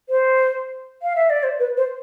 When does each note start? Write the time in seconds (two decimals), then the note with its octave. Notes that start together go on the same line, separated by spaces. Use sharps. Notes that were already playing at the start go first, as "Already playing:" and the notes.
0.09 C5
1.03 F5
1.16 E5
1.30 D5
1.43 C5
1.60 B4
1.77 C5